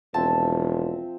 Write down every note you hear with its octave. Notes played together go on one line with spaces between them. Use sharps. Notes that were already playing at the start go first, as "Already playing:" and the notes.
E1 F3 C4 E5 A5